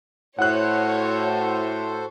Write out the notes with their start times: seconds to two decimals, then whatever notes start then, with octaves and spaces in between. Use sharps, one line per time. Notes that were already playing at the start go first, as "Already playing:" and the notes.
0.39 A2 F#4 A4 C5 C#5 F#5 F#6